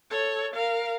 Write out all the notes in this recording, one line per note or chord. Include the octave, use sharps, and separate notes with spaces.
A4 C#5
A#4 F5